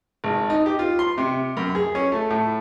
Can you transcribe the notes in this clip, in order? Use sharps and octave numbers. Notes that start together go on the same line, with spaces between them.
G#1
D#4
G4
F4
C6
C3
F#2
G#4
C#4
A3
A2